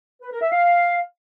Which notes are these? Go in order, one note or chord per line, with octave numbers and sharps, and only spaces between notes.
B4
A#4
E5
F5